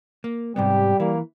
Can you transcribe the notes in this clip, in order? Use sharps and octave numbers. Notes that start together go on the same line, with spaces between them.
A#3
G#2 C3 G3 B3 G4
E3 A#3